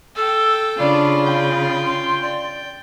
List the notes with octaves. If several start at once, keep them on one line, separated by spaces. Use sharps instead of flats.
A4 G5 E6
C#3 D4 F4 D5 B5
G5
C6
D5